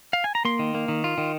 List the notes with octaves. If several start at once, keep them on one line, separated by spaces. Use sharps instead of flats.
F5
G#5
A#5
A#3 C6
D#3
A#3
D#3
F4
D#3